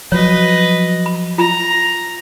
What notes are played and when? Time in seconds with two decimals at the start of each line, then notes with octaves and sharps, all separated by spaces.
0.12 F3 F#3 B4 C#5 D#5
1.06 B5
1.38 F4 A#5 B5